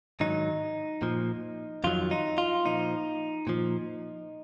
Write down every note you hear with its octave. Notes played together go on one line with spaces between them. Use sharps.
G#2 D#3 F#3 D#4
A#2 F3
F2 D#3 F#3 F4
D#4
F4
A#2 F3 D#4
A#2 F3